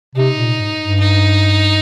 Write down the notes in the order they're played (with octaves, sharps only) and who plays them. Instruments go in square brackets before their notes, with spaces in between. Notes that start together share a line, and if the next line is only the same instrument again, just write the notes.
[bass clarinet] C3 [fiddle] D#4
[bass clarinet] A#2
G#2
G2
[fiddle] D#4